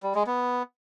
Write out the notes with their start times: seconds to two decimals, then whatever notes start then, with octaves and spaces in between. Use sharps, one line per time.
0.03 G3
0.15 G#3
0.27 B3